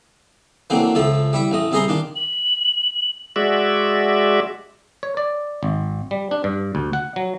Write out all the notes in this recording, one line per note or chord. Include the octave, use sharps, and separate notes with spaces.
E3 F#3 A3 A#3 C4 D4
C#2 F3 A3 A4 A5
G3 E4 E5
A1 A3 D#5
C2 E4 G#4 D#5 A#5 C6
D#3 D4 F4
F#7
G#3 F#4 D5 E5
C#5
D5
G#1
G3
D4
G2
D2
F#5
F#3